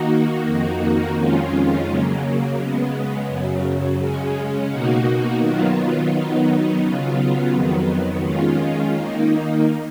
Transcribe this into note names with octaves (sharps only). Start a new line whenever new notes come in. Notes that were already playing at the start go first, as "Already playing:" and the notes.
Already playing: D#3 A#3 D#4 F#4
F2 D#3 A#3 D#4 F#4
F2 D#3 G#3 C#4 F4
C#3 F#3 A#3
C#3 G#3 B3
F#2 C#3 F#3
C#3 G#3 C#4
B2 A#3 D#4 F#4
D#3 F#3 B3 F4
D#3 F#3 B3 D#4
C#3 F#3 B3 F4
F2 D#3 F#3 B3
D#3 G#3 C#4 F4
D#3 A#3 D#4